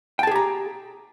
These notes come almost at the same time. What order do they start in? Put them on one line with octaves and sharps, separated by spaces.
G5 A5 G#4 G4 A#5